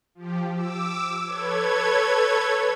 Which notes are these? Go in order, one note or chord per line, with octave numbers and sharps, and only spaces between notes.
F3 G4
D6 E6
A4 B4 C#5 G#6